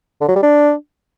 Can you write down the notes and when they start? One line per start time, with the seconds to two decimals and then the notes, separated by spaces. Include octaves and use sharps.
0.21 D3
0.28 F#3
0.35 G3
0.43 D4